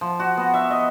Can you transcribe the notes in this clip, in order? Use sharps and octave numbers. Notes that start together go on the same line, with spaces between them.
F3
F#4
B3
E5
D#5